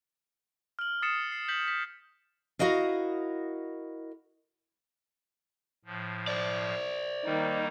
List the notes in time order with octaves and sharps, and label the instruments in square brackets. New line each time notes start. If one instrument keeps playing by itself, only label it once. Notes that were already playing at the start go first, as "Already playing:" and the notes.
[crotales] F6 F#7
D#6 A6 C7 C#7 E7
C7
G6 B6 F#7
B6
[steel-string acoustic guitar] E4 F#4 A#4 D#5 F5
[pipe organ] A2 F3
[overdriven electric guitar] C5 D5
[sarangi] D#3 [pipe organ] G3 A#3 D#4